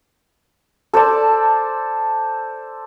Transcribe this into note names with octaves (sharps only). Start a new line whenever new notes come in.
A4 C5 D5 A5